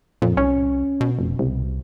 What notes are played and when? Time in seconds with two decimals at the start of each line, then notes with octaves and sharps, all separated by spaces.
0.22 F2 A#2
0.37 C2 C#4
1.01 B2
1.19 F1
1.39 C2